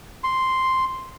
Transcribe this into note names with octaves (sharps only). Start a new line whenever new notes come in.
C6